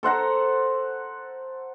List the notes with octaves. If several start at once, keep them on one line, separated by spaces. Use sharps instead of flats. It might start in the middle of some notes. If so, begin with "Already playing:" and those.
A4 C5 F#5 A#5